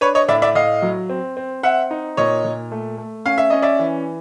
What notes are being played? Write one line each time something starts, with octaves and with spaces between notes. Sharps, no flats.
D4 B4 C#5
C#5 D#5
A2 D5 E5
D5 E5
A2 D#5 F5
F#3
C4
C4
C4 E5 F#5
D#4
A#2 C#5 D#5
A#2
A3
A3
C#4 F5
E5
C#4 D#5
D5 E5
E3